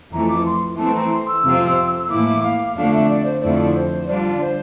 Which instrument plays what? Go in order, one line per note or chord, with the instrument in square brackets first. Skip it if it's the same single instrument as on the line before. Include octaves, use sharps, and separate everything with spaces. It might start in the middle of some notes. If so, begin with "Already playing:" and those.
[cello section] F2 E3 A3 [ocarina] A#5
[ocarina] D6
C6
[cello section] E3 A3 C4 [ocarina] A5
[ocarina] A#5
C6
E6
[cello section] F2 C3 F3 C4 F4
[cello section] A2 E3 A#3 E4 [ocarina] D6
[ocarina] F5
[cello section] F2 D3 A3 D4 [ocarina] F5
[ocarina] E5
D5
C5
[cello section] F2 D3 A3 E4 [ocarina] D5
[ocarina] C5
[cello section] D3 G3 D4 F4 [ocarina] D5
[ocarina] C5